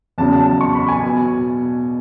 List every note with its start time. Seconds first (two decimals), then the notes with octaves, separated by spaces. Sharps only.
0.18 E2 C#3 F#3 A5
0.33 A5
0.46 A5
0.61 C#6
0.75 B5
0.89 G#5
1.05 B2